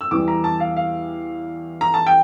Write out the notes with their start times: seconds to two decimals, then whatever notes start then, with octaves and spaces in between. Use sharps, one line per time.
0.01 E6
0.11 E2 E3 G3 D6
0.28 A#5
0.44 A5
0.60 F5
0.76 F5
1.81 A#5
1.94 A5
2.07 G5